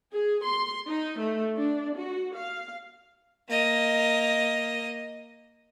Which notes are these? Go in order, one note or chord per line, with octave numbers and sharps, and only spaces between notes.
G#4
C6
D#4
A3
D4
F#4
F5
A#3 D#5